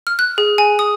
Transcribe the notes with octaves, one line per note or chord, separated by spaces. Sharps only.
F6
F#6
G#4
G#5
D#6